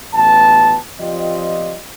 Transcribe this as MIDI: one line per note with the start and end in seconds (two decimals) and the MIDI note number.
0.14 0.75 33
0.14 0.75 47
0.14 0.75 59
0.14 0.75 81
0.99 1.76 53
0.99 1.76 60
0.99 1.76 65
0.99 1.76 67
0.99 1.76 74
0.99 1.76 75